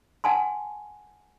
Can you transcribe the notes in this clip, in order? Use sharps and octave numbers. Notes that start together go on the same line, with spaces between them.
F#5 G#5 A5 C6